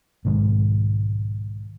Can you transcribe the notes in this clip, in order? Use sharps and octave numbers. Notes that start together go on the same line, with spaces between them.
B1 G#2 D#3 G#3